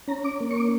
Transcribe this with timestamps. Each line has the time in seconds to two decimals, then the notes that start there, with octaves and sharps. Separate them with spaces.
0.08 C#4 A#5
0.24 D6
0.41 A#3
0.51 C#6
0.56 D6